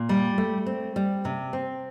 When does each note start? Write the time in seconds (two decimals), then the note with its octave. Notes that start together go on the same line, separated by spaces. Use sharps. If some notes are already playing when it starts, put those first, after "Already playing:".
Already playing: A#2
0.09 G3
0.38 A3
0.66 C4
0.96 G3
1.25 C3
1.53 C4